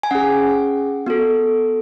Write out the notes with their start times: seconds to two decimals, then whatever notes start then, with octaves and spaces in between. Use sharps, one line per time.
0.03 G#5
0.11 C#4 G#4 F#5
1.06 B3 F#4 A4